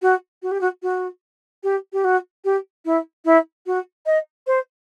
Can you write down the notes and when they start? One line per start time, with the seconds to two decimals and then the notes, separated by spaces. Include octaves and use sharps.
0.02 F#4
0.42 F#4
0.51 G4
0.61 F#4
0.82 F#4
1.63 G4
1.93 G4
2.04 F#4
2.45 G4
2.85 E4
3.25 E4
3.66 F#4
4.06 D#5
4.47 C5